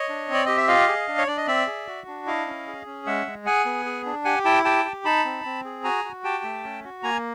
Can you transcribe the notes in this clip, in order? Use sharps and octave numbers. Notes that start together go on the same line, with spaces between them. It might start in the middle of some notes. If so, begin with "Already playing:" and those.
Already playing: C#5 D#5
D4
C4
D5
G4 D#5
E5
F4 D#5 F5
G#4
D4
C#5
D4 D5
D#5
C4 D5 E5
G#4
F#4
D4
E4 D#5 F5
C#4
G#4
C#4
G#3 E5 F#5
G#3
G#4 F#5 G#5
B3
G#4
D4
G4 F#5 G#5
E4 G5 A5
G4 G5 A5
G4
D#4 A5 B5
C4
C4
G#4
F#4 G#5 A#5
F#4
G4 G5 A5
A3
C#4
F#4
A#3 G#5 A#5